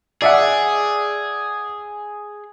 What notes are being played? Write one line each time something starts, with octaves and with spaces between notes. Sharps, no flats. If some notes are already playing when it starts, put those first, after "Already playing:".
G#4 D5 E5 F#5